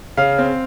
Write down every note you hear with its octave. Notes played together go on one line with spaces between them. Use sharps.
C#3 F5
C4